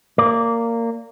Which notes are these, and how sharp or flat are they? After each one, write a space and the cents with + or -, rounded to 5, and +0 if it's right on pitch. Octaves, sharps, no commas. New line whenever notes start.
A#3 -15 D5 -15